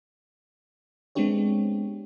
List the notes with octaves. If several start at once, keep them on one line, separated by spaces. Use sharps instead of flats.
G#3 B3 C4 D4 G4 C#5